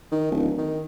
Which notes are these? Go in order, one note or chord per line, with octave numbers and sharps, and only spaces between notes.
D#3
D1
D#3